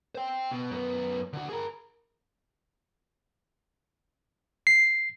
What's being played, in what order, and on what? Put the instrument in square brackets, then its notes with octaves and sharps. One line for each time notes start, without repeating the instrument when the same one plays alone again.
[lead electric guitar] C5 G5
B2
F#2 B3
D3 F#4
G#4 A#4
[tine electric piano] C7